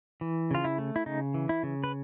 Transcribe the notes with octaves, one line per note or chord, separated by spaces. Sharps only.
E3
C#3 F4
E4
A3
E4
C#3 D#4
E3
E4
C#3
B4